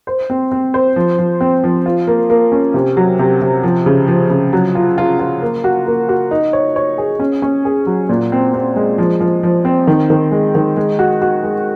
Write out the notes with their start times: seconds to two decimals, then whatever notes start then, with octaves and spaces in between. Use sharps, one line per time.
0.07 C5
0.30 C4
0.52 C4
0.74 C5
0.96 F3
1.19 F3
1.41 C4
1.64 F3
1.86 F4
2.07 A#3
2.30 A#3
2.52 C#4
2.74 C3
2.97 F#3
3.19 C3
3.42 C3
3.63 F3
3.86 C#3
4.08 F3
4.30 C#3
4.53 F#3
4.75 F4
4.98 F4
5.19 F4
5.42 A#3
5.64 F#4
5.87 A#3
6.09 F#4
6.31 D#4
6.53 C#5
6.76 C#5
6.98 G#4
7.20 C#4
7.42 C#4
7.65 G#4
7.87 F#3
8.09 A#2
8.32 C4
8.54 C4
8.76 G#3
8.98 F3
9.20 F3
9.43 F3
9.65 C4
9.87 D#3
10.10 D#3
10.32 G#3
10.55 D#3
10.77 G#3
10.99 F#4
11.22 F#4
11.44 G#3